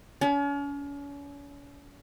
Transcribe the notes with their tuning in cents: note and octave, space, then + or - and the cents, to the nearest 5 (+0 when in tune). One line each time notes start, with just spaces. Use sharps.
C#4 +40